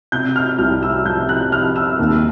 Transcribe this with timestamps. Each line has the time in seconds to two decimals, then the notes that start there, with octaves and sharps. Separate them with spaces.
0.12 C3 G6
0.36 F6
0.59 C2 F6
0.83 E6
1.05 F3 G6
1.29 F#6
1.52 C3 F6
1.76 E6
1.99 D#2